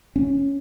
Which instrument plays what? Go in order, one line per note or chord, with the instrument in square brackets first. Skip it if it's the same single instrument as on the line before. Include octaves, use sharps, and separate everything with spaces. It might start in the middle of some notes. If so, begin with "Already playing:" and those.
[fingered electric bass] C#4